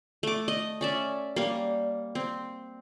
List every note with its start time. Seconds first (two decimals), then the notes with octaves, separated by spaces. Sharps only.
0.23 A3 D6
0.48 D#5
0.81 C#4 D5 E5
1.36 G3 A#3
2.15 C4